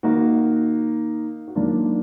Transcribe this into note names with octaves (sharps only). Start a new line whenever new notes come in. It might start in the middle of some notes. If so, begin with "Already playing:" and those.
D#3 A#3 D#4 F#4
F#4
D#3 F#3 A#3 D4 F4